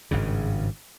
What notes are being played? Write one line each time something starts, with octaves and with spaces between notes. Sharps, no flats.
G#1 G2 C#3